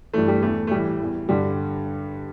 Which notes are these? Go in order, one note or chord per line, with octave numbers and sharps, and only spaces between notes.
G2 E3 A3
G3
E2 E3 A3
A3
A2 E3 G3
E2 E3
G2 D3 G3